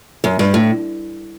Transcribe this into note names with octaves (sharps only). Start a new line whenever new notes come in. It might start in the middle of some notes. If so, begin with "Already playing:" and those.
F#2
G2
A2